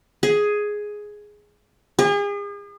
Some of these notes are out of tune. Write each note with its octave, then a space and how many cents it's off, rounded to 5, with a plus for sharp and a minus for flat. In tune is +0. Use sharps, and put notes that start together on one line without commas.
G#4 +5
G#4 -40